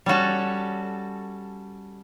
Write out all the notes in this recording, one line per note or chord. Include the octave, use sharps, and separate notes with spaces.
G3 C#4 F#4 A4